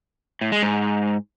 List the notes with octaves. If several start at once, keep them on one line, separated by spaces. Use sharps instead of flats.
A2
G#3
G#2